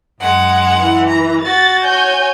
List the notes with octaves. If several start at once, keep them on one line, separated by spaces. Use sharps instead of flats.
F#2 G#3 F#5
E3
A#5
F#4 A6
C#5 G#5 G6